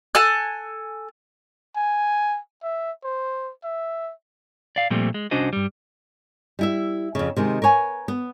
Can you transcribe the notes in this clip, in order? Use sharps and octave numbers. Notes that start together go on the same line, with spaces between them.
A4 G#5 F#6
G#5
E5
C5
E5
D5 F5
A#2 F3 G3 A3 C4
G#3
C2 C#4 D4 F#4 C5 D#5
G2 G3
G3 E4 E5
F2 C#3
C3 D#3 G#3
A#4 B4 C#5 G#5
B3